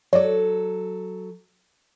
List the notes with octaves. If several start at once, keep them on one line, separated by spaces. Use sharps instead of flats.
F#3 A4 C#5 D5